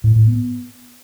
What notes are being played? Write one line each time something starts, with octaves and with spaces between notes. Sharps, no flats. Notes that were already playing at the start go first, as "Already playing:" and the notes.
A2
A2
B3